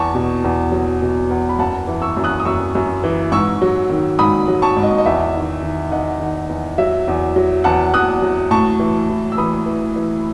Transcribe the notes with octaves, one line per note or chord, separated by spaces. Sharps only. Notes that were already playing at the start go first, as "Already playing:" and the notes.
Already playing: E2 A5 C#6
B2
E2
F#3
B2
E2
B5
F#2 F#5 A5
E3
C#6 E6
F#2
D#6 F#6
D#6
F#2 C#6 E6
F#2
E3
G#2 C#6 E6
F#3
D#3
G#2 B5 D#6
F#3
A5 C#6
G#2
D#5
D#5
E2 E5
D#3
D#3
D#3 D#5 F#5
D#3
E2
F#3 E5
E2
F#3
E2 F#5 A5
E2 D#6 F#6
F#3
A2 A5 C#6
E3
E3
E6
E3 B5 D#6
E3
E3